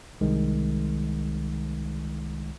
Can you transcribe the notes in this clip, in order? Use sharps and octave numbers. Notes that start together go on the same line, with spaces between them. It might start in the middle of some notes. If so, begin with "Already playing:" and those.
C2 D#3 G#3